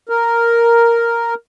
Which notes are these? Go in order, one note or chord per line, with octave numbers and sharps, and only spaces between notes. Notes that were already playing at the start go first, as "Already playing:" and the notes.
A#4